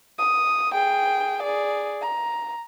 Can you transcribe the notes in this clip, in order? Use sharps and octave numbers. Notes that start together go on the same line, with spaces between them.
D#6
G#4 G5
G#4 D5
A#5